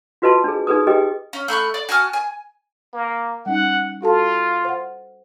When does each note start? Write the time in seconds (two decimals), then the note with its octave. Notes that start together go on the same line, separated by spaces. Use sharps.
0.22 F4 F#4 B4 D#5 A5 C6
0.44 D4 G#4
0.67 D#4 G#4 B4 D#6
0.87 G4 G#4 B4 D#5 G5
1.33 C#4
1.48 A3 B5 C#6 F#6
1.74 D5
1.89 F#4 G#5 A5 F6
2.13 G#5
2.93 A#3
3.46 G3 C#4 D#4 F#5
4.02 F4 F#4 A4 A5
4.65 C5 F#5